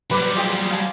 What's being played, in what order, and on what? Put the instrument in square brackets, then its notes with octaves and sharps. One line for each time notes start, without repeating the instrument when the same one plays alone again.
[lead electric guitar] F#3 G3 [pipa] B4 [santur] C5 D5
[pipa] F4 G4 [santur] G#4
[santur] F5 G#5 A5